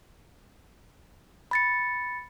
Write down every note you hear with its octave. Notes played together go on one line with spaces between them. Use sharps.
B5 A6 C#7